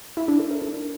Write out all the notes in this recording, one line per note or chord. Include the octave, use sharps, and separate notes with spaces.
E4
D4
A4
A#4
D4